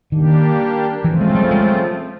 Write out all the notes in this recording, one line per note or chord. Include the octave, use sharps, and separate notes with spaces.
D#3 G3 A#3 D4 G4
C#3 E3 F3 A3 C4 F4
G#3
G3
G#3